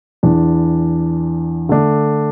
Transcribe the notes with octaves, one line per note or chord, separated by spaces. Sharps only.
E2 E3 D4
D3 A3 D4